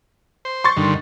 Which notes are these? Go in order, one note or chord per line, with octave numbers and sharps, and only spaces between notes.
C5
C6 C#6 A6
G2 D3 D#3